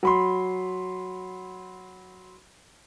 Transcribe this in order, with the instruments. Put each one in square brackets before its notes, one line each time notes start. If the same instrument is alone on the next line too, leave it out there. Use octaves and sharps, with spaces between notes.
[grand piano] F#3 B5 C6